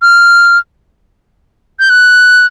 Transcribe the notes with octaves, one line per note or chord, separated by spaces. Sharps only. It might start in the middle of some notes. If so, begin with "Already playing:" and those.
F6
G6
F#6